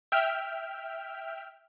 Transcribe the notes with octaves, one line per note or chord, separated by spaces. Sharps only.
E5 G5 F6